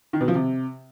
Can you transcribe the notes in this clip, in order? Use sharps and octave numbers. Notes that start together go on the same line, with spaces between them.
D#3
B2
F3
C3